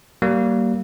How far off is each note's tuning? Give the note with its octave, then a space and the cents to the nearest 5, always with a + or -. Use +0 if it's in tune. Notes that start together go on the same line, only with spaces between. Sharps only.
G3 -30 A#3 +0